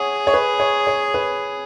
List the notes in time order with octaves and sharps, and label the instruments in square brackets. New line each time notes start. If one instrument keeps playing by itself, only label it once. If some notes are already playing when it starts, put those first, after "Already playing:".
Already playing: [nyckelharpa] G#4 [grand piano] C#5 F#5
[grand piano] C#5
B4
C#5
C#5
B4